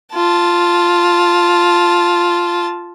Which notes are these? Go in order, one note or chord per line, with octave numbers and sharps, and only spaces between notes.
F4 A5